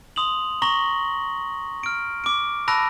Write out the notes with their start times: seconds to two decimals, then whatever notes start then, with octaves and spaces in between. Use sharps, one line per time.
0.16 C6 D#6 F7 F#7
0.62 A#5 C#6 A#6 F#7 G7
1.83 F6 D7
2.24 D6 D7
2.68 A5 B5 E6 F#6 A#6 D7